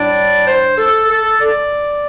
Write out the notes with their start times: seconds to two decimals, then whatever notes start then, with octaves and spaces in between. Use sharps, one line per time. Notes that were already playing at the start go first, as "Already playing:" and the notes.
Already playing: A2 G3 D4 D5
0.47 C5
0.77 A4
1.08 A4
1.40 D5